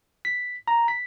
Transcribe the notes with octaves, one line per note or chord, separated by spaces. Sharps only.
B6
A#5
B6